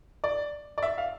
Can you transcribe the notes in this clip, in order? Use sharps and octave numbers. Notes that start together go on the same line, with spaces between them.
D5
D5
E5
F5